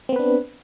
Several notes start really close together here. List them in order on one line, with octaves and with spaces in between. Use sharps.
C4 B3 B4 D4